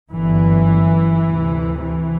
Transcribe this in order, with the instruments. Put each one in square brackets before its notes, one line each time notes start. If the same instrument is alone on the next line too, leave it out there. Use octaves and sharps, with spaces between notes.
[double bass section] G1 F#2 E3
D2 C3
E3